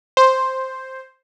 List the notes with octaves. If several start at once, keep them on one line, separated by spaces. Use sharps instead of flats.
C5